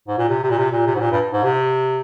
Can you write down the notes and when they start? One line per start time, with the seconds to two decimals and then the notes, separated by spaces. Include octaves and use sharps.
0.08 G#2
0.18 A#2
0.29 C3
0.44 C3
0.51 A#2
0.58 C3
0.72 A#2
0.86 C3
0.95 G#2
1.01 A#2
1.12 G2
1.33 G#2
1.44 C3